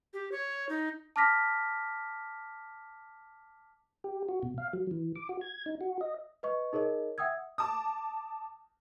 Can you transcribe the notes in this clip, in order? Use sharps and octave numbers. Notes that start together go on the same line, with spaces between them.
G4
C#5
D#4
A5 D6 F6 A#6 B6
G4
F#4
B2
F5
F#3
E3
D6
F#4
G#6
D#4
F#4
D#5
B4 D#5 C#6
D#4 G#4 A#4 C#5 D#5
E5 F#5 G5 D#6 E6 G#6
A5 D6 D#6